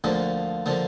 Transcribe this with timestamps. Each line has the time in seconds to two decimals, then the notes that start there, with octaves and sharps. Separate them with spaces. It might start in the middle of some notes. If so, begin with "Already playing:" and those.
0.04 D2 D3 F3 A#3
0.66 D3 F3 A#3